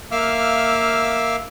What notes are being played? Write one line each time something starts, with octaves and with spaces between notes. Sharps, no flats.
A#3 E5 F5 D6 E6 F6